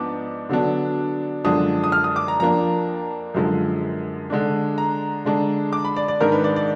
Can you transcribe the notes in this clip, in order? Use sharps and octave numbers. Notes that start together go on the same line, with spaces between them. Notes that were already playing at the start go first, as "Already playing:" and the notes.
Already playing: G#2 F3 B3 D4 D6
D3 F#3 B3 D4
F#2 D3 F3 G#3 D4 D#6
D#6
F6
D#6
D6
A#5
F2 F3 A#3 D4 A#5
F#2 D3 F3 G#3
D3 G#3 D4
A#5
D3 G#3 D4
D6
B5
D5
D5
G#2 D#3 G#3 D4 A#4
B4
D5
D5